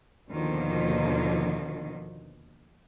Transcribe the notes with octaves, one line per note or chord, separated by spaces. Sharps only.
D#2 B2 D3 D#3 F3